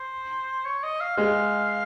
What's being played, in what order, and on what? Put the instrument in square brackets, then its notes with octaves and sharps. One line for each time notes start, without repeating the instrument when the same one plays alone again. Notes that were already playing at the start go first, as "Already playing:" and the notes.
Already playing: [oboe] C5
C#5
D#5
F5
[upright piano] G#3 [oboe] F5